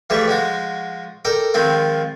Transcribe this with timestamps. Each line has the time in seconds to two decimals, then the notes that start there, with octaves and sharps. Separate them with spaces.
0.10 E3 F3 G3 A3 G#4
0.28 F3 G#3 F#4
1.25 A4 A#4 D5 G5
1.54 D#3 F3 G#3 C4 F4